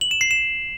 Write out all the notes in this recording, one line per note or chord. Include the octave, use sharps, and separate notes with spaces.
F#7
E7
C7
E7